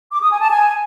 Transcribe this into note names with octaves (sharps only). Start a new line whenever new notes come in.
D6
D#6
G#5
A5
G#5